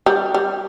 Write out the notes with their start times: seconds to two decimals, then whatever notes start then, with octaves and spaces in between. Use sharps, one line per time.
0.06 G3
0.34 G3